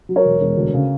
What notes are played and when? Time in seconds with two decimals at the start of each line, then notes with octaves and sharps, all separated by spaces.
0.09 F#3
0.16 A#4 C#5
0.25 E1
0.41 E1
0.57 D2
0.74 C#3